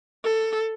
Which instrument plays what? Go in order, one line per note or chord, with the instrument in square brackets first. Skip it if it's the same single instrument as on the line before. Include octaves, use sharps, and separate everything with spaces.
[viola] A4